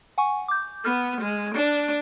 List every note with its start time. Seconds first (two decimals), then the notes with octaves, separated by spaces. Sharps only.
0.18 F#5 G#5 C#6
0.48 D6 G6
0.85 B3 F6
1.21 G#3
1.55 D4